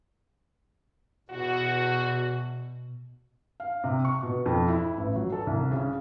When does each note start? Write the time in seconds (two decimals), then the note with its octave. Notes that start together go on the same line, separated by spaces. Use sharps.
1.30 E2 B2 F#4
3.60 F5
3.84 C3
4.05 C#6
4.23 B2
4.46 F2
4.69 E4
4.98 A1
5.16 F#3
5.32 A4
5.47 C2
5.71 C#3